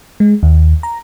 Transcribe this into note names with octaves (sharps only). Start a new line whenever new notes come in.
G#3
D#2
A#5